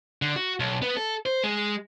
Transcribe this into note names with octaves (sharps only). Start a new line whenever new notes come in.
D3
F#4
B1
B3
A4
C5
G#3